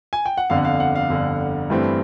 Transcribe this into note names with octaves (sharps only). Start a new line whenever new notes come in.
G#5
G5
F#5
G1 F2 D3 F5
F#5
F5
F#5
F5
G1 F2 D3
G2 E3 A3 C4